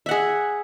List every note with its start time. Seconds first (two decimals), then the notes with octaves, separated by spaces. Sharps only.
0.06 E5
0.09 F#5
0.11 G#4